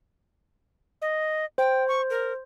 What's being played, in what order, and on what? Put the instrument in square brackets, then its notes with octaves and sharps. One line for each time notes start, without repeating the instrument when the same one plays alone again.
[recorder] D#5
[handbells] C5 [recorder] G5
[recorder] C#6
A#4